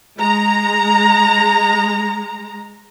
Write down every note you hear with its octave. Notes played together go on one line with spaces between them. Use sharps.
G#3 A#5